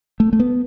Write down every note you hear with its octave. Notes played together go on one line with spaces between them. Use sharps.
A3
A3
B3